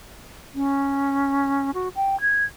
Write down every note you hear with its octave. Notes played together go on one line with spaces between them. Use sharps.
C#4
F#4
G5
G#6